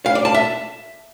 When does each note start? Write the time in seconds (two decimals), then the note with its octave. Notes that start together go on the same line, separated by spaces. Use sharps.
0.06 F5
0.15 D5
0.25 A5
0.34 E5